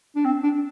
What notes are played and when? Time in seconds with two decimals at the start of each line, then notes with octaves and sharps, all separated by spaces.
0.16 D4
0.25 C4
0.43 D4